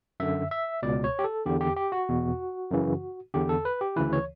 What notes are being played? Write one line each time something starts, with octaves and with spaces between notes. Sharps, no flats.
F#2 D3 E5
E5
C#2 B2 D5
C#5
G4
A4
E2 D3 G4
G4
G4
F#4
E2 B2
F#2 C#3 E3
E2 D3 G4
A4
B4
G4
D2 C#3 E3 B4
C#5